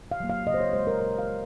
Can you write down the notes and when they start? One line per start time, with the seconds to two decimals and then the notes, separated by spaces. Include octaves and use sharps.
0.11 F5
0.20 F#3 A#3
0.30 F5
0.47 C#3 D#5
0.54 C5
0.60 C#5
0.73 G#3 C5
0.87 A#4
1.00 A#2 A#4
1.19 F5
1.28 G#3